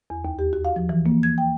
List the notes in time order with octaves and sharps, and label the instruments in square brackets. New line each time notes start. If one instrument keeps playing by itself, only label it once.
[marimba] E2
D#2
G4
F#4
F5
F3
E3
A#3
G#6
G5